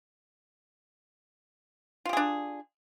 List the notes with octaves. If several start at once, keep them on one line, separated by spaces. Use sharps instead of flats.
D4 F4 G4 G#4